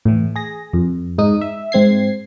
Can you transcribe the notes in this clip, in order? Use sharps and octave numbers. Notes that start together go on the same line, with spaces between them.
A2 E3
G#4 A#6
F2
G#2 D#4 D#6
E5
G#2 C4 G#6 C7